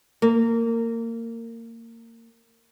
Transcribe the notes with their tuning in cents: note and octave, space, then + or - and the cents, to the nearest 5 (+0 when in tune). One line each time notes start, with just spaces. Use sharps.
A#3 -25